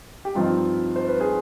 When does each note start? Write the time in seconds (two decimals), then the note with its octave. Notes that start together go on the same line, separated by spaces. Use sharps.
0.25 G4
0.35 G2 F3 C4 D#4 F4
0.96 C5
1.08 B4
1.21 G#4